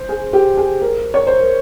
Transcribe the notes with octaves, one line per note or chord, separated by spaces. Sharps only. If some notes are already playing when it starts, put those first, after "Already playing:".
Already playing: C5
G#4
G4
G#4
A#4
C#5
C5
A#4